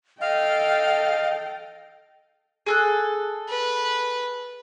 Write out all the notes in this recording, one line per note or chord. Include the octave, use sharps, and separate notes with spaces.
A4 D#5 F5 G5
G#4 A4 F#6
B4